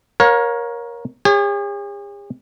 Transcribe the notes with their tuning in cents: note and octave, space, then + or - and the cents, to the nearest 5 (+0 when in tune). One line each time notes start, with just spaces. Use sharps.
A#4 +20 C#5 -5 F5 +40
G#4 -45 C#5 +0